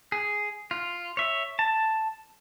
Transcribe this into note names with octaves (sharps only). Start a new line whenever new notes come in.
G#4
F4
C#5 E5
A5